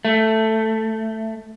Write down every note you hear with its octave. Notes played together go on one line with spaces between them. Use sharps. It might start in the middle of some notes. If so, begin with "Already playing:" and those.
A3